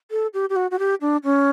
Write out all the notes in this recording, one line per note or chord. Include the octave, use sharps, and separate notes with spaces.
A4
G4
G4
F#4
F#4
G4
D4
C#4